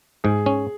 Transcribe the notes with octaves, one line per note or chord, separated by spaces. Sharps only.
G#2 G#4
C#4